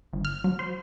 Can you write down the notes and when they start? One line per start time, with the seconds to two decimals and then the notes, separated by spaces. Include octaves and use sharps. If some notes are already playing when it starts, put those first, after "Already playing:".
0.13 G1
0.25 F6
0.44 F#3
0.59 C5